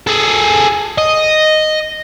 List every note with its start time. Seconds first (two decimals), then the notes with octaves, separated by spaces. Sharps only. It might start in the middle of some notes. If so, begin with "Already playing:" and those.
0.07 G#4 A4
0.98 D#5